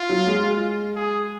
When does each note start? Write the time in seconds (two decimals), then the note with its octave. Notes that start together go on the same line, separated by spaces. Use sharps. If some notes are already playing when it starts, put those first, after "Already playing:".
Already playing: F4
0.09 F#3
0.27 G#3
0.96 G#4